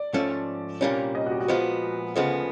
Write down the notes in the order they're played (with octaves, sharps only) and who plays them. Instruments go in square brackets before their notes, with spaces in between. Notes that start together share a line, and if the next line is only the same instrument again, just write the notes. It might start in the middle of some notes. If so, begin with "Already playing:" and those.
Already playing: [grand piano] D5
[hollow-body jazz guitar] G#2 F3 A3 C#4
C2 A#2 G3 A#3 C#4
[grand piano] D#5
F#4
G4
F#4
[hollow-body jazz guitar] A#2 F3 G#3 B3
D2 C#3 F3 G#3 B3